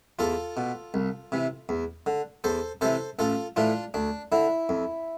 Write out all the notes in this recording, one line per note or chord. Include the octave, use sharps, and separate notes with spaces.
E2 F4 A4
B2
C2
C3 E3
E2
D3
E2 A4 C5
C3 E3 A4 C5
A1 F4 A4
A2 E3 D4 F4
D2 D4
D3 E4
F2